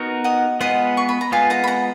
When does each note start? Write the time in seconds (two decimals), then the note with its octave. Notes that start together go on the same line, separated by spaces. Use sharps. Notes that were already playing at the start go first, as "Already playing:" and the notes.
Already playing: B3 D#4 F#4 A#4
0.24 D#5 F#5
0.60 G#3 B3 F4 B4 D#5 F#5
0.97 C#6
1.09 B5
1.21 A#5
1.32 G#3 B3 F4 B4 F5 G#5
1.50 F#5 A#5
1.64 B5
1.67 F#5 A#5